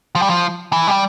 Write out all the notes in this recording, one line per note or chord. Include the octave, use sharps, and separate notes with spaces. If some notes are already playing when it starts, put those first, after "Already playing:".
F3
G3
F3
E3
G3